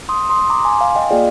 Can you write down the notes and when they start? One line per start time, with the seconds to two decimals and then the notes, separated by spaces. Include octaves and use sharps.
0.09 C6 D#6
0.30 C6 D#6
0.50 A#5 D6
0.65 G#5 C6
0.80 F5 G#5
0.95 D#5 G5
1.10 A#3 F4 G#4 D5 F5